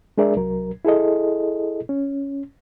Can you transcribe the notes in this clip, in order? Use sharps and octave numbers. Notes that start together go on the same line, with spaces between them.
G#3 D4 G#4 A#4 D5 E5
C2 F#3 A#4
E4 G#4 A4 D#5
C#4